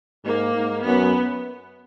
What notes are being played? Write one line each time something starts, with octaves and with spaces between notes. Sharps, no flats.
G#2 A#3
G#2
F#2 B3